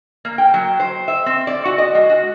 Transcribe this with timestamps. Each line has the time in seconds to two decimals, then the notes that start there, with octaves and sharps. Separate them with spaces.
0.25 A#3
0.38 G5
0.54 F#3
0.80 C5
1.08 E5
1.26 C4
1.47 D5
1.65 F#4
1.78 D#5
1.95 G#3
2.10 F#4